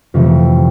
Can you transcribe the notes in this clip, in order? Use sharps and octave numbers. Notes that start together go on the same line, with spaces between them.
F2 C3 E3 A3